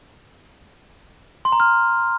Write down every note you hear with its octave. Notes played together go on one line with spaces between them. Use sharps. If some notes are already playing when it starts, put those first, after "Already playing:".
C6
A#5
F6